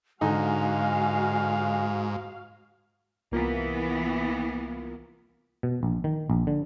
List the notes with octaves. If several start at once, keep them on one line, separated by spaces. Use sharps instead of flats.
G#2 D3 D#4 F#4 F5 G#5
C2 E3 A#3 B3 F4
B2
A#1
D#3
A#1
D3